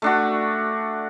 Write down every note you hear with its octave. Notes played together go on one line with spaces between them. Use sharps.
A3 D4 F#4